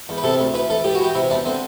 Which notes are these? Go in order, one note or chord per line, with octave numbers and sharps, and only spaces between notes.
E2
B4
C3 A4
D2
E3 B4
E3 A4
E3 G4
F#4
E3 G4
C3 E4
E2 D4
D3 C4